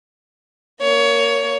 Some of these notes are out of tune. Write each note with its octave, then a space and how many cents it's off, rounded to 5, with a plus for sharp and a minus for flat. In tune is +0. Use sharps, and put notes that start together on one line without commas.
A#3 +0 C#5 +20